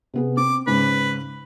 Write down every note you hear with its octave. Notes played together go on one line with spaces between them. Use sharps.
C3 B3 G#4
C4 D6
G#2 C#3 C#4 B4